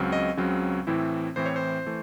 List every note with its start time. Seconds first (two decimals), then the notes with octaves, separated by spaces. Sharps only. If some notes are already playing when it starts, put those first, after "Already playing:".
Already playing: C#2 C#3 F#3 C4
0.12 D#5
0.37 C#2 C#3 F#3 C4
0.87 A2 E3 C4 E4
1.36 A2 E3 C4 E4 C5
1.46 C#5
1.56 C5
1.86 E3 A3